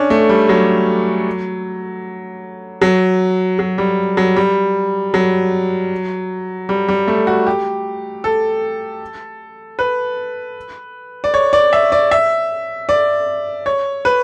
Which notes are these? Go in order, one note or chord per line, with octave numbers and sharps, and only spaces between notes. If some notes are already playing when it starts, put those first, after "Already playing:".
Already playing: C#4 D4
A3
G3
F#3
F#3
F#3
G3
F#3
G3
F#3
G3
G3
A3
F#4
G4
A4
B4
D5
C#5
D5
E5
D5
E5
D5
C#5
B4